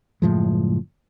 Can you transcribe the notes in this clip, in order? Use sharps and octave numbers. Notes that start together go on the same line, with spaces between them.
F#1 A2 F3 G#3